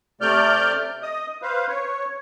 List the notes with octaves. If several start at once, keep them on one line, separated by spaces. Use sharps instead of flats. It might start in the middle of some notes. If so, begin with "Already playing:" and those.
C3 A3 D5 F6 G6
D#5 D#6
B4 C5 F5
C#5